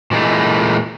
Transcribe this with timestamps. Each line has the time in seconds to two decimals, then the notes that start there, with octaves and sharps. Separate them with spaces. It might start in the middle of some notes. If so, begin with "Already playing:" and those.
0.11 A#2 E3 G#3 A3